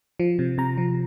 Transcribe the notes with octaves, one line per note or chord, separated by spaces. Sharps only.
F3
C3
C3 A#5
F3